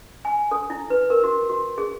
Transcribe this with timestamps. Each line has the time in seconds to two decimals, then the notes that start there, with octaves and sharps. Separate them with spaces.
0.25 G#5
0.51 A4
0.70 E4
0.90 B4
1.10 A#4
1.24 F#4
1.49 F#4
1.78 G#4